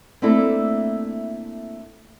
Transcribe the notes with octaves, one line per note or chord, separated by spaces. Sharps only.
A3 A#3 C4 D4 E4 A4